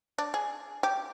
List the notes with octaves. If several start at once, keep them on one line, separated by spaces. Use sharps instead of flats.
D4
G#4
G4